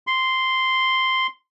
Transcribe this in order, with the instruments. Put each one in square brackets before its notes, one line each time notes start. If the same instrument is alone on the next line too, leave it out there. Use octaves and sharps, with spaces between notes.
[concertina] C6